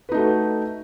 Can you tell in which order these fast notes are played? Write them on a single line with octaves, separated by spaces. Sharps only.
B4 D#4 A3 F#4